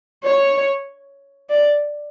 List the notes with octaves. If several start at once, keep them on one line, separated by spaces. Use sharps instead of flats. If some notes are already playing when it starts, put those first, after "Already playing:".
C#5
D5